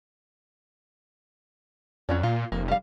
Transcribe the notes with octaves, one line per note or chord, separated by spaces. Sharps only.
F2 F#3 C#4 D5
A#2 F4
F1 A#3
G3 F5